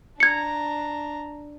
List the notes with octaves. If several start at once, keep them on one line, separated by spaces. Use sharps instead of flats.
D4 A#5 G#6 C#7